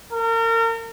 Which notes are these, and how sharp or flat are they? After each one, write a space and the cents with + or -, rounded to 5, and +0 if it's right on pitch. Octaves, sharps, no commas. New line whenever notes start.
A#4 -35